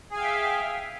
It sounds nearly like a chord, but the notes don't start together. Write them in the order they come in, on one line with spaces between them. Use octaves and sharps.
G#4 G#5 F5 G5 E5